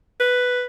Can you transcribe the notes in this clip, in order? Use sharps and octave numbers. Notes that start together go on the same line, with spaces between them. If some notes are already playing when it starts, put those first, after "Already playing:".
B4